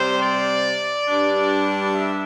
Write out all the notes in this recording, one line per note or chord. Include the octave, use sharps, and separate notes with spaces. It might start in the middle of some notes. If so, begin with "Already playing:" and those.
Already playing: C3 G3 C4 C5
D5
G2 G3 D4
E5